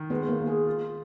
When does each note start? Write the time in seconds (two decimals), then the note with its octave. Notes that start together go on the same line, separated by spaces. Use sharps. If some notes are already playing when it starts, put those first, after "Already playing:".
Already playing: D#3
0.10 G#3 B3
0.29 A#3
0.39 G#3
0.47 G#4
0.66 F4